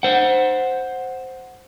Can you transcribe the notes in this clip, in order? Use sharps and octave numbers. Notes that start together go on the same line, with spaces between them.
C5 F#5